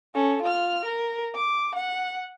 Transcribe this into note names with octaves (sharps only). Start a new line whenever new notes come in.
C#4 A4
F4 F6
A#4
D6
F#5